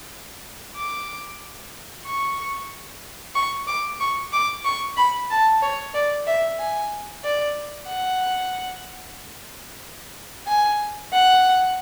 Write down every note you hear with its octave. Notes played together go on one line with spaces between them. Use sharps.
D6
C#6
C#6
D6
C#6
D6
C#6
B5
A5
C#5
D5
E5
G#5
D5
F#5
G#5
F#5